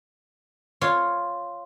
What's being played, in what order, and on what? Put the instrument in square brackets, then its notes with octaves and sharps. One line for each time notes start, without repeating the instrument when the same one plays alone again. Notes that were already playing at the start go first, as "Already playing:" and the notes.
[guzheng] F4 C#5